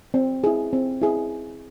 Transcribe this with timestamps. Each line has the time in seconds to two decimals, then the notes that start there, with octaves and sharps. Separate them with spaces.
0.14 C4
0.44 E4 G#4
0.73 C4
1.02 E4 G#4